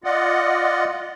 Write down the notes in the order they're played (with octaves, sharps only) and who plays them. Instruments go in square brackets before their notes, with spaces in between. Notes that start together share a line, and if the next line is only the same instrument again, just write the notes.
[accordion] F4 D5 D#5 F#5